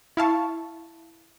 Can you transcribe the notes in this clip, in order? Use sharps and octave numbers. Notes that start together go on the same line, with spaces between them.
E4 F5 A5 C#6